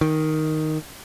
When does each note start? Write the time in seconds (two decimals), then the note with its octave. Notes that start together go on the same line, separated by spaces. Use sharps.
0.01 D#3